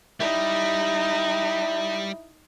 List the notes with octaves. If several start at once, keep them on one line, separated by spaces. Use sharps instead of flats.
G3 D#4 E4